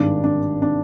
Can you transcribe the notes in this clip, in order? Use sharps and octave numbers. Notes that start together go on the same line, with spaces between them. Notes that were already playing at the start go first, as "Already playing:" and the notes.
Already playing: G#1 G2 D#3 G#3 D4
D4
D4